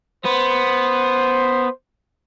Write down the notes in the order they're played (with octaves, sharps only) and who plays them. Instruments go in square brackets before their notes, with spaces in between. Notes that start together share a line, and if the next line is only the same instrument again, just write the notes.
[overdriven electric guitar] B3 [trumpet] C5